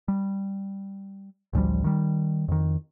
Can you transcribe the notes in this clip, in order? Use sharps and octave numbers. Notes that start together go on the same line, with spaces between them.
G3
A1 D2 F3 G3
D#3 G3
F2 D#3